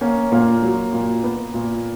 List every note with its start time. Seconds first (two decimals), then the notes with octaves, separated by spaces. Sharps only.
0.01 A#3 C#4
0.32 A#2 A#3
0.62 F#3
0.93 A#2
1.23 B3
1.54 A#2